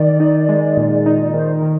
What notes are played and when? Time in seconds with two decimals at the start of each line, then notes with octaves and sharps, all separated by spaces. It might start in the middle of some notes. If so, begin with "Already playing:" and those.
Already playing: D#3 D5
0.20 D#4
0.49 G#3
0.77 A#2
1.06 D#4
1.34 D#3 C5
1.54 A#4
1.62 D#3